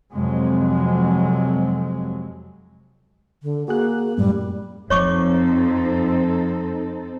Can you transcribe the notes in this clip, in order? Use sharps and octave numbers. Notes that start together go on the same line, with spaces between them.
F2 C3 F#3 G#3
D3
A#3 F#4 G#4 F#6
F#2 A2 G3
F2 F3 C4 D#4 A4 C#5 C#6 D6